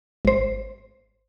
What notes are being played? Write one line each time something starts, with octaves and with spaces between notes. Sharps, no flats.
G#1 C5